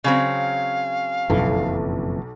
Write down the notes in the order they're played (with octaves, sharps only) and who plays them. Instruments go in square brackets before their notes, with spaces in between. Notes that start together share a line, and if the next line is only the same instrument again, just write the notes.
[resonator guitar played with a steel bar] C#3 F#3 C4 [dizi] F5
[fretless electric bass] F#1 F2 E3 [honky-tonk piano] B1